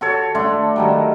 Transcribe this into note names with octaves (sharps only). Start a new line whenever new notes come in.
F#4 A4 C#5
A3 D4 F#4 C6
D#3 F#3 G3